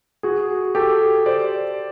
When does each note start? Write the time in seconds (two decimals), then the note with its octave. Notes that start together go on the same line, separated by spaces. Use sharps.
0.23 F#4 G#4
0.75 G4 A4
1.26 C5 D5